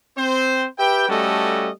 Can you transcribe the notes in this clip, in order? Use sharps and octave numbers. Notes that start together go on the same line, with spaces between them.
C4 C5
G4 B4 E5 G5
G3 A3 C#4 F#4 A4 D#5